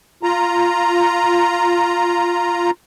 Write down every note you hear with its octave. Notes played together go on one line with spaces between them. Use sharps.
F4 A#5